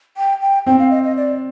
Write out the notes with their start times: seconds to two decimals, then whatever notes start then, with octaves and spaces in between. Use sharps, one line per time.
0.17 G5
0.41 G5
0.67 C4 G5
0.79 F5
0.91 D#5
1.04 D#5
1.17 D5